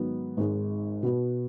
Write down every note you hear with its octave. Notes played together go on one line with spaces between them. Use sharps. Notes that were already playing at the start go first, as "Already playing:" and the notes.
Already playing: G#2 D#3 F#3 B3
G#1 G#2 G#3
B2 B3 F#4